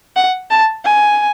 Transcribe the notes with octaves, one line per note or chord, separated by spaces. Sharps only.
F#5
A5
G#5